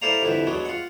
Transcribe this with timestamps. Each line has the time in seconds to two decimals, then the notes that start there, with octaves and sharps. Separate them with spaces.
0.02 E4 A4 C5 D5 F5 A#5
0.22 C2 F2 D3 E4 B4
0.47 B2 F#3 G#3 D4
0.65 F4 F#5